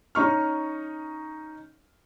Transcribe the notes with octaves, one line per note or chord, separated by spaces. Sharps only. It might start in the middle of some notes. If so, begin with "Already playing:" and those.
C#4 D#4 C#6 F6